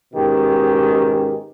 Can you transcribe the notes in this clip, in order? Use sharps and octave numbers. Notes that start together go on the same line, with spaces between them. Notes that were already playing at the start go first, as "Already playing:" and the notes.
G#2 B2 D#3 C#4 G4